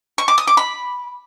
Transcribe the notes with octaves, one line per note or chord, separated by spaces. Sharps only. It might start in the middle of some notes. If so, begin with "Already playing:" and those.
C#6
D6
D#6
D6
B5